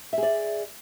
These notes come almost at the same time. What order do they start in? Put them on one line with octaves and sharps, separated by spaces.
E5 G#4 D5